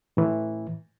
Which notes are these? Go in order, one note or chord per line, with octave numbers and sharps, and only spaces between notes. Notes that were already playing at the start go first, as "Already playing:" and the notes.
A2 E3